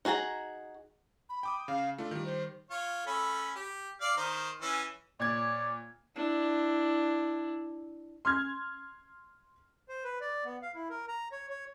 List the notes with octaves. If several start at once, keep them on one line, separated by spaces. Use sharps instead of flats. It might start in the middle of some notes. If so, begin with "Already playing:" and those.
D#4 F#4 G#4 A5 A#5
B5
G5 D6 D#6
C#3 F5
A3 D4 F4
D#3 G3
C5
F4 C#5
A3 C#4 B5
G4
D5 F5
D#3 C5 A#5
E3 C#4
A#2 C#5 D5 G#6
D4 E4
C6 F6 G#6
C5
B4
D5
B3
F5
E4
A#4
A#5
C#5
C#5